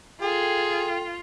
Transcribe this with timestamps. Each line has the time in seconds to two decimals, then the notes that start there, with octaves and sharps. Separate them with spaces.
0.22 F4 G#4 A4 G5